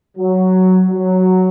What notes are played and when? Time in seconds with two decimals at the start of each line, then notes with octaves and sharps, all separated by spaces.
0.18 F#3
0.90 F#3